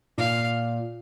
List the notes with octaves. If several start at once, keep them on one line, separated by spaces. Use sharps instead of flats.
A#2 F5